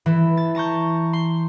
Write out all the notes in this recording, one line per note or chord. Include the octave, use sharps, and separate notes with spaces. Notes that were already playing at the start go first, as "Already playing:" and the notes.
E3 E4 A4
A6
A5 A#5 C#6 G6
C6